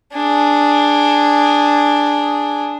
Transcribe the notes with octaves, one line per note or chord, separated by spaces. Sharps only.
D4 G#4